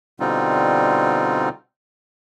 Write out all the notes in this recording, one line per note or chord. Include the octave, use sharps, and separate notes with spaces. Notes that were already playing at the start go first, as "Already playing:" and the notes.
B2 D3 G3 C4 D#4 F4